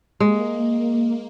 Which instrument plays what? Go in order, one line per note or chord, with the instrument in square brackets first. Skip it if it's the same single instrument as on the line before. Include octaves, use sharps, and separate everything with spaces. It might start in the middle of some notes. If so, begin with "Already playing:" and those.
[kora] G#3 [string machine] A#3